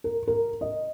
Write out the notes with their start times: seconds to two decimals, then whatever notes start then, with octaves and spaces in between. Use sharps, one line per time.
0.04 A#4
0.27 A#4
0.61 D#5